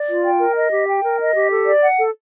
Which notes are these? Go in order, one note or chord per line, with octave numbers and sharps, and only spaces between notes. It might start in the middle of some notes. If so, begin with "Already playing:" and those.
Already playing: D5
F4
G5
A#4
D#5
G4
G5
A#4
D#5
G4
A4
D5
F#5
A4